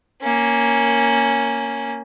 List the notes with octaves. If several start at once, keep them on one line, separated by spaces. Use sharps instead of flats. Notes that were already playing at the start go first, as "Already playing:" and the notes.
A#3 C#4